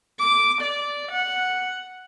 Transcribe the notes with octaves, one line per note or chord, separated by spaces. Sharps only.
D6
D5
F#5